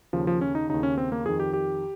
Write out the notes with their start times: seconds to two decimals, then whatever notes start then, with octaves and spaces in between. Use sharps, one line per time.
0.13 D#2 C#3 F3
0.27 F3
0.41 C#4
0.55 D#4
0.69 D#2 C#3 D#4
0.83 C#4
0.98 C4
1.12 A#3
1.25 F2 D#3 G#4
1.40 G4
1.53 G4